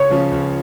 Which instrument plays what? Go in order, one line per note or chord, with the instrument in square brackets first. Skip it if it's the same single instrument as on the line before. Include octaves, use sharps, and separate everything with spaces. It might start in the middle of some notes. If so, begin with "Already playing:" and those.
Already playing: [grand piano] C#2 [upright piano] C#5
[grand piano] C#3 F3 C#4
C#2